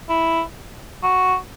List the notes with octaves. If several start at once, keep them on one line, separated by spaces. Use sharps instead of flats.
E4
F#4